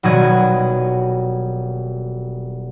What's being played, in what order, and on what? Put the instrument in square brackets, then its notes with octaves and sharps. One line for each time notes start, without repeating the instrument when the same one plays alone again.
[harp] D#1 B2 F#3 F#4 G#6 D#7